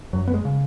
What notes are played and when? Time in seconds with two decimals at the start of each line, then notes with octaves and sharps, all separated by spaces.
0.13 F#2 F#3
0.28 B3
0.34 G#3
0.45 C#3